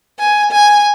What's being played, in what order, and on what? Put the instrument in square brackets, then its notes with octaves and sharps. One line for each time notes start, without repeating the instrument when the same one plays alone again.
[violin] G#5
G#5